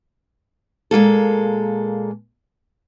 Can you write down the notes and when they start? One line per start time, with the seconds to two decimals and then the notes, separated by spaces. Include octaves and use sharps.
0.91 A#2 G#3 A#3 A4